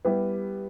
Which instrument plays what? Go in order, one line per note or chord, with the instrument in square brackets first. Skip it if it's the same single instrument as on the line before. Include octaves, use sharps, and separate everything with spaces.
[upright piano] G3 B3 E4 G4